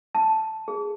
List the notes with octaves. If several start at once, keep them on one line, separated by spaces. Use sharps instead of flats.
A5
G#4